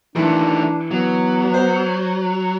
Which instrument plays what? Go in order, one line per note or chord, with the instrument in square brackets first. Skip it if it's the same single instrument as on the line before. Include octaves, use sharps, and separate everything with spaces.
[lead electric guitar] D#3 A3 [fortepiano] E3 [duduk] D4
[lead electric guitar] F#3 [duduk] B3
[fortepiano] C5